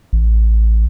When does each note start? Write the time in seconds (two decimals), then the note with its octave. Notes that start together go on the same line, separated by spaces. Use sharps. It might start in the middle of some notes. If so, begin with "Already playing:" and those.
0.13 A1